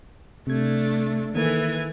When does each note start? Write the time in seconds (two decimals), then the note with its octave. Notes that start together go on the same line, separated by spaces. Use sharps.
0.47 C3 A3 D4 G#6
1.34 D#3 E3 A#3 A4 G#5